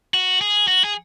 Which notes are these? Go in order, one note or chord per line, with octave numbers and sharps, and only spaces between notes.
F#4
G#4
F#4
G#4